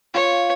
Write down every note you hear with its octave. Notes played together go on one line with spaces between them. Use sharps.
F4 C#5